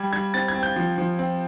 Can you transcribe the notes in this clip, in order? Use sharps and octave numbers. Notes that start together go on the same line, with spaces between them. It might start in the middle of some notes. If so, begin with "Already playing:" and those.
Already playing: G3 G#6
G3 G#6
C4 A6
G#6
C4
G6
F3
F3
C4